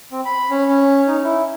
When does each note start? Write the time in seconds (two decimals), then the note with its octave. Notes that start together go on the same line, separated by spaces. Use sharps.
0.12 C4
0.26 B5
0.50 C#4
0.68 C#4
1.07 D#4
1.24 E4